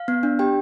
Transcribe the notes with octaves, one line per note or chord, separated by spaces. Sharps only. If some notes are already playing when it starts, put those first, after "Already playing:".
Already playing: F5
B3
D4
G4 G5